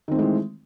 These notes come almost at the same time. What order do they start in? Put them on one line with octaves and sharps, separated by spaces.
D#3 C4 A3 G#3 E3